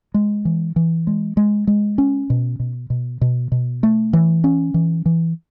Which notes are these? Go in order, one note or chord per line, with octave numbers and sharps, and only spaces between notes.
G#3
E3
E3
G#3
G#3
G#3
C#4
B2
B2
B2
B2
B2
A3
E3
C#4
E3
E3